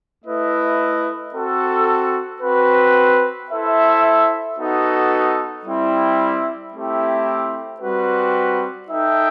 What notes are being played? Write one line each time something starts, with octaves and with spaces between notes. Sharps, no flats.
A3 E4 B4 D#5
C4 F#4 A4
C4 F#4 B4
E4 A4 C5 E5
B3 D#4 F#4 A4
G3 C4 E4
A3 C4 E4 G4
G3 C4 F#4 B4
D#4 A4 E5 G5